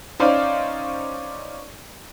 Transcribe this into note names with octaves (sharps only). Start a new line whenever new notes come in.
C#4 D#4 C5 D5 F5